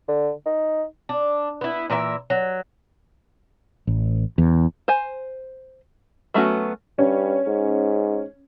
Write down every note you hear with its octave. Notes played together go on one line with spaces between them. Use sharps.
D3
D#4
D4
B3 E4
A#2 E3 A#4 E5
F#3
A1
E2
C5 G#5
F#3 A3 B3 C#4 F#4
G2 C#4
G#2